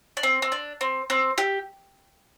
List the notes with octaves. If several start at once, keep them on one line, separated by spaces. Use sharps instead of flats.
D4
C4
C4
D4
C4
C4
G4